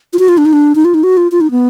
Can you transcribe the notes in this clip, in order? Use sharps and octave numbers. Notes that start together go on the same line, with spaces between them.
F4
F#4
F4
D4
D#4
D4
D#4
F4
D#4
F#4
F4
F4
D#4
B3